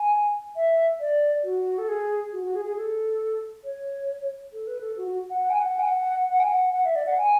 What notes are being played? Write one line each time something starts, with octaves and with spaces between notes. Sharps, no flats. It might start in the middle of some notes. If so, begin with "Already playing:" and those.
Already playing: G#5
E5
D5
F#4
A4
G#4
F#4
F#4
G#4
G#4
A4
C#5
A4
B4
A4
F#4
F#4
F#5
F#5
G#5
F#5
G#5
F#5
F#5
G#5
F#5
F#5
E5
D5
F#5
G#5